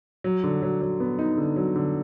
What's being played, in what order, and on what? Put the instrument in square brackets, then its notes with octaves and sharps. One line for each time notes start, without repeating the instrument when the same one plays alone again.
[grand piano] F#3
D3
F#3
F#3
B3
D#4
D3
F#3
D3